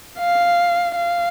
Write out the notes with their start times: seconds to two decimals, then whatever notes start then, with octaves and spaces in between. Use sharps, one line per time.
0.19 F5
0.96 F5